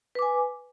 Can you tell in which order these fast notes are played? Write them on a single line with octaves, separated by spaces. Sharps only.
B4 D6 G#5